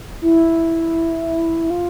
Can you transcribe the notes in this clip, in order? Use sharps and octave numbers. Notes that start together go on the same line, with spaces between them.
E4
F4